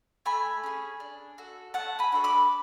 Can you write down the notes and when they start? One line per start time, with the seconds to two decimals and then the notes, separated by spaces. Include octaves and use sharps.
0.25 A3 G#5 B5
0.63 C#4 G#4
1.00 D4
1.38 F#4 A4
1.74 A3 F#5 A5
1.99 G#5 B5
2.12 D4 F#4 A4
2.24 B5 D6